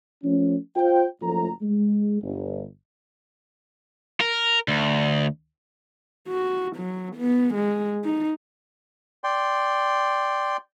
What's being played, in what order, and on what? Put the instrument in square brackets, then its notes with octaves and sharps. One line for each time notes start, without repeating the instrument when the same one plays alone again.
[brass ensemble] F3 A3 C#4
F4 C5 G5
F#1 F3 A3 A#5
G#3
G1
[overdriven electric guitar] A#4
D2
[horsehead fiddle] F#4
F#3
B3
G#3
D#4
[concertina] D5 G5 C6